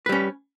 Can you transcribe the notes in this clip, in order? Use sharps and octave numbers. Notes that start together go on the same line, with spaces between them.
G3 C#4 B4